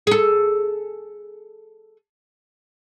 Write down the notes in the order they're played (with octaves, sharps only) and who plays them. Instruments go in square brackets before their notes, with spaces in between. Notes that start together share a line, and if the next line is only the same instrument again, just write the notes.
[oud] G#4 A4